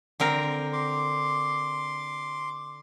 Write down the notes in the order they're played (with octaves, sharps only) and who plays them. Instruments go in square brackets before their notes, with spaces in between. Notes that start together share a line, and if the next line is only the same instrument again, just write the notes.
[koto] D3 C4 A#4
[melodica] C6 D6